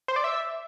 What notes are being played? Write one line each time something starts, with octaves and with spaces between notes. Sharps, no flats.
C5
D5
E5